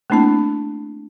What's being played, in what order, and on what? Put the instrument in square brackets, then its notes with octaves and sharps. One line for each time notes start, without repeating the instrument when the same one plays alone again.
[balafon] A3 A#3 C4 D4 E4 A5